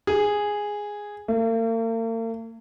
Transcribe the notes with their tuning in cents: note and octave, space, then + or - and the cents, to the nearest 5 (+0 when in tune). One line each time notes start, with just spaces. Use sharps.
G#4 -5
A#3 -45